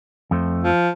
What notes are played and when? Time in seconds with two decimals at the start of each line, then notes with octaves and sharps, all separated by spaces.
0.31 F2 A3 C5
0.64 F3